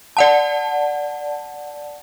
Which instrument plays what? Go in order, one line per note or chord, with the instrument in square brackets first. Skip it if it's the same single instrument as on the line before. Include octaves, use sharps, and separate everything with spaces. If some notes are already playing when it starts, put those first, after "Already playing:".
[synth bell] D5 F#5 A5